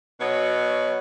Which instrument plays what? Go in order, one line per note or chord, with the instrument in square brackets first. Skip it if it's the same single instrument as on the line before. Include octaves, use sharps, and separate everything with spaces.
[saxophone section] B2 F#3 B3 C#5 D#5